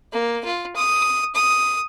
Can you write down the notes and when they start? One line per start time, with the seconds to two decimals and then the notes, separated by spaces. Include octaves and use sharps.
0.13 A#3
0.45 F4
0.76 D#6
1.35 D#6